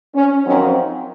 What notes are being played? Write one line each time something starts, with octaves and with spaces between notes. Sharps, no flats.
C#4
F2 D#3 F#3 C4 C#4